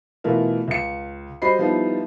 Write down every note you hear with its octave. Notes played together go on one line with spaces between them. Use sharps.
B2 E3 A3 F4 A#4
C#2 C#7
G3 F#4 C5 D#5 B5 C7
F3 G3 B3 D#4 E4